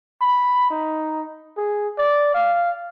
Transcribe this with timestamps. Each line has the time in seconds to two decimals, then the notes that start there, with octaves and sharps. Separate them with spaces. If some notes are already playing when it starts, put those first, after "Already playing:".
0.21 B5
0.70 D#4
1.57 G#4
1.98 D5
2.34 F5